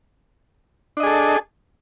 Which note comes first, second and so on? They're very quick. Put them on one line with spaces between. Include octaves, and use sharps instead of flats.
D4 D#5 G#4 A4